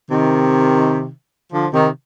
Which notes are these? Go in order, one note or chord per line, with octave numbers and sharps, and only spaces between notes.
C3 D#3
D3 F3
C3 D#3